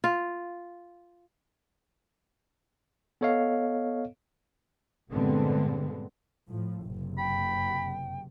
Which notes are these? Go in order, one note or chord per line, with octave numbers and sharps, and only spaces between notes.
F4
B3 A4 C#5 D#5 F5
G2 A#2 D3 G#3 B3 C4
A2 F3
F#1 C3
G5 B5